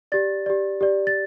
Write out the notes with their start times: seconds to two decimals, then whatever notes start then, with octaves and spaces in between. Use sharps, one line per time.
0.12 G4 D5 A6
0.46 G4 D5
0.81 G4 D5
1.07 A6